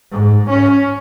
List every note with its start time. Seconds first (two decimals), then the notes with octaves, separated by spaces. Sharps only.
0.12 G#2
0.49 C#4